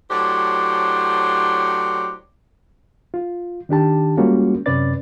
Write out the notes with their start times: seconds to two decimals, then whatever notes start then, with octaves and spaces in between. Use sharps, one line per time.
0.11 A2 F#3 D4 G4 C5
3.14 F4
3.69 D#3 D4 G4 A5
4.17 G3 G#3 A#3 C#4 F4 F#4
4.66 F#2 C3 C#4 B4 D5 A6